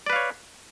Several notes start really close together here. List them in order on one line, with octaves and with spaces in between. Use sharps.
D5 B4 F5 C#5